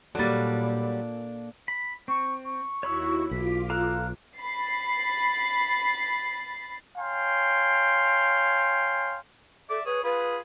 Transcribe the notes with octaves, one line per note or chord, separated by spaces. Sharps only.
A#2 F#3 G3 A#3 D4 A4
B5
C4 C#6
C#6
D#2 E4 F#4 C#5 B5 E6
B1 F4 D6 B6
A4 F5 A#5 F#6
B5 A6 C7
C#5 F5 G5 G#5 A#5 C6
A4 D5 E5 D6
G#4 B4 C#5
F4 G#4 B4 B5